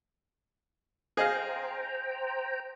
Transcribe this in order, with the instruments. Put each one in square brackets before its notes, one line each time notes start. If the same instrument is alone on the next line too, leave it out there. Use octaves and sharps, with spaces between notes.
[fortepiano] G#4 D#5 F5 [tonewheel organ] C5 G5 A#5